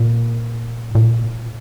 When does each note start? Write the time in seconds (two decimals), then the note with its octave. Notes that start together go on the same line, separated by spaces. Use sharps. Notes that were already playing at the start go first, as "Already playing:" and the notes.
Already playing: A#2
0.95 A#2